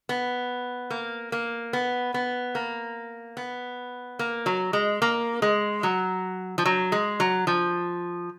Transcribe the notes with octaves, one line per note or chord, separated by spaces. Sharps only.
B3
A#3
A#3
B3
B3
A#3
B3
A#3
F#3
G#3
A#3
G#3
F#3
F3
F#3
G#3
F#3
F3